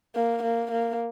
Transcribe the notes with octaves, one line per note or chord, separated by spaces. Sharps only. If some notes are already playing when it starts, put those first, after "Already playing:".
A#3
A#3
A#3